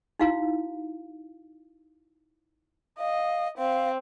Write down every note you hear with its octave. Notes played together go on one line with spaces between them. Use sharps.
D#4 E4 F#4 F5
D#5 F5
C4 F5